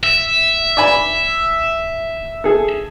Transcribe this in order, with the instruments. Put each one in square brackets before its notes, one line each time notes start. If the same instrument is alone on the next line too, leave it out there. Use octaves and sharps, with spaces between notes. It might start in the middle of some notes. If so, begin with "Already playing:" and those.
[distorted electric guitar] E5
[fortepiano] D5 G#5 B5
G#4 A4